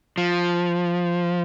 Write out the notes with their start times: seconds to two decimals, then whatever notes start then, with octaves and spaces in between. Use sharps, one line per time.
0.18 F3